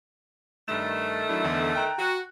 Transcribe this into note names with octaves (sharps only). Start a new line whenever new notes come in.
G2 D#3 A3 E7
F#3 D4 E4
E2 D3
G5 A#5 F#6
F#4